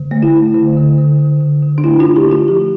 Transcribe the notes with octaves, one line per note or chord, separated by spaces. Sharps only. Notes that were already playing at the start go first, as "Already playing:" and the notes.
Already playing: D3
A3
E4
A3
D3
D3
D3
D3
D3
D3
D4
A3 E4
D3 F4
G4
A3
F4
F3 G4